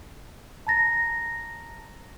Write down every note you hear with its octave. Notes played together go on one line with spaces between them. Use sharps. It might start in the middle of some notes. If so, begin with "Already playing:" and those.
A5 A#5 A6 A#6